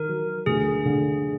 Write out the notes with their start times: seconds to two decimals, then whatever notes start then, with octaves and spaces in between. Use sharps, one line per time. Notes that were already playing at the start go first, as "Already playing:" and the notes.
Already playing: D#3 A#4
0.09 F#3
0.46 D2 G#4
0.85 D3